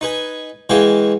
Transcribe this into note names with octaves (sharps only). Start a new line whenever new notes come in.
D#4 B4 G#5
E3 G#3 F#4 F5 G5 G#5